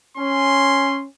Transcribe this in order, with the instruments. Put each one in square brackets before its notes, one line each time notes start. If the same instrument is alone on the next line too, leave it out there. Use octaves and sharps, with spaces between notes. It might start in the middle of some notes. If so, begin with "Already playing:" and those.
[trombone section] C#4 [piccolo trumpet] C6